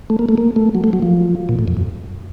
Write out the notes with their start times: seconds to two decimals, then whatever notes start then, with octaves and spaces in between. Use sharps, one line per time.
0.10 A3
0.19 A#3
0.29 A3
0.38 A#3
0.56 A3
0.75 F#3
0.84 A3
0.93 F#3
1.02 F3
1.49 A#2
1.59 A2
1.68 F2
1.77 F#2